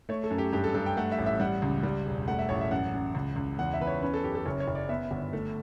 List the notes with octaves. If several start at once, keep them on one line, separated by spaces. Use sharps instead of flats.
A3 C#5
A4
F#2
G4
G2 G4
A4
G2 A4
G5
A3 F#5
E5
A1
E5
G3 F#5
C#2
G3
E1
A3 F#5
E5
A1 C#5
E5
F#2 F#5
F#2
C#2
C#2
E2 F#5
E5
E2 B4
C#5
C#4 B4
A4
F#2 G4
A4
F#1 C#5
C#5
F#1
D5
B3 E5
G1
A3